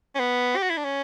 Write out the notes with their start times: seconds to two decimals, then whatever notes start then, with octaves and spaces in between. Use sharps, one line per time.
0.15 C#4
0.19 B3
0.56 G4
0.62 F#4
0.70 E4
0.77 D4
0.84 C#4